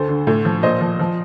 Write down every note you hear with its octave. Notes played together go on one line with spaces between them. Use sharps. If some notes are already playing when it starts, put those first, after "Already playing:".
Already playing: D2 A4 C5
D3
A2
F3
A#2 C5 D#5
F3
F3